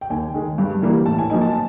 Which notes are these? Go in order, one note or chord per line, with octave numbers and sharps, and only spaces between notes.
G5
D#2 G#5
D#3 G#3
G2
E3 G3 A#3
A2 A5
G#5
F3 A#3 D#4 G#5
A5